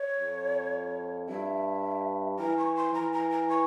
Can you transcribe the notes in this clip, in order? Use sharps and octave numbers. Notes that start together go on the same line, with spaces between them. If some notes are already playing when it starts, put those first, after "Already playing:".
Already playing: C#5
F2
G2 E5
E3 A#5
C#6
C6
E3 A#5
A#5
A#5
C#6